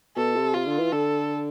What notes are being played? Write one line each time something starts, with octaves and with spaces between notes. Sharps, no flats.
B2 A4
C3
C3 F4
D3
E3
D3 A4